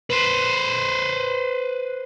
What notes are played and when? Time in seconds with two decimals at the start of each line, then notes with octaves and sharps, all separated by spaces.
0.10 B4 C5